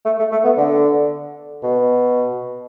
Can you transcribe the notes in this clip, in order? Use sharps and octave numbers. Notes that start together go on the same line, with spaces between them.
A3
A3
A3
B3
D3
B2